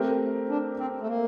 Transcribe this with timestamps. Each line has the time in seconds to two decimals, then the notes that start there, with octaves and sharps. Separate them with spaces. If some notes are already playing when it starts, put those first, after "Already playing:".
Already playing: A3 C4 G4 A#4
0.49 D4
0.78 C4
1.01 A3
1.07 A#3